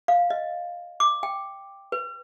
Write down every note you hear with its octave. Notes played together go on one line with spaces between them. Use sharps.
F5
D#5
D6
G5
B4